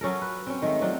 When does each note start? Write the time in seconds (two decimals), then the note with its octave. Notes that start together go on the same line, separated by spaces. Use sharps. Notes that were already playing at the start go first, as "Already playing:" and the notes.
0.01 F#3 C#4 A4 A#4
0.22 B4
0.47 C4 C#4
0.62 D#3 G#3 A3
0.81 F#3 C4 D4 F4